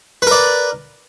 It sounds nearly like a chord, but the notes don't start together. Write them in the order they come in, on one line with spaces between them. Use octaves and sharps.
B4 A#4 D5